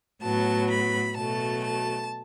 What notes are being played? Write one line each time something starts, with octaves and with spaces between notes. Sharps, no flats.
A2 F#3 B3 A5
B5
B2 F#3 A3 A5
A5